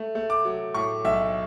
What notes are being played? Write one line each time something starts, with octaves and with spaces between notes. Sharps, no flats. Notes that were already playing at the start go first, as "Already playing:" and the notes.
Already playing: A3
A3
D6
F#3
A2 C#6
B1 E5